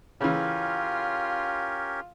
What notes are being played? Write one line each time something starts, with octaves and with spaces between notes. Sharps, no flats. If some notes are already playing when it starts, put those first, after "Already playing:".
C#3 E3 C#4 F4 G4 A#4